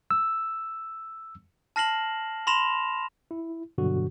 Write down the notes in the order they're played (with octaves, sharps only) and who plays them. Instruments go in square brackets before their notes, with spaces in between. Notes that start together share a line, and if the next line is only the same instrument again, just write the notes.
[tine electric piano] E6
[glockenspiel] A5 F6 A#6 C7 E7 F#7
B5 C6 A#6 E7 F7
[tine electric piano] E4
G2 B2 D3 F#3 F#4